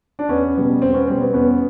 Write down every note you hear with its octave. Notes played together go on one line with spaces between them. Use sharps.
D4
E2 B3 C#4
B2 G3 B3
E2 C4
B3 C#4
B2 G3 B3 C4
B3
E2 B3 C#4